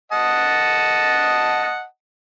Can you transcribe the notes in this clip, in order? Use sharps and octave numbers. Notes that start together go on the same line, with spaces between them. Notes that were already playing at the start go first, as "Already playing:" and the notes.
D#5 F#5 A5